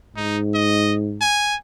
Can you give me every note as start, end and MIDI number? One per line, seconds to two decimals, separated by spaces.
0.16 1.27 44
0.16 0.39 63
0.54 0.95 75
1.21 1.56 80